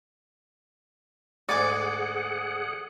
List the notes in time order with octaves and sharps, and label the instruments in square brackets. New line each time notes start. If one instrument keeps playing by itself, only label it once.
[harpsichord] D2 G#2 [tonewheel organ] G#4 F#5 [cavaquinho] D5 G#5 D6